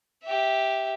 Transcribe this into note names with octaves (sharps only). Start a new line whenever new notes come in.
G4 E5